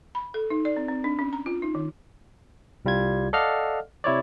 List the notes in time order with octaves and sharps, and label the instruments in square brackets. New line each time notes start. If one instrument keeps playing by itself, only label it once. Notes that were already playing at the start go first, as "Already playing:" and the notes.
[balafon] B5
A4
D#4
D5
C4
C4
D4
C#4
A#5
F4
D#4
D#3
[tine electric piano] C2 G3 F4 G#6
A4 D5 D#5 F5 F#5 F6
C3 E4 C#5 D5